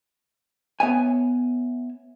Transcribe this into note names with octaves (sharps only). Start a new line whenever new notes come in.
B3 C#5 E5 G#5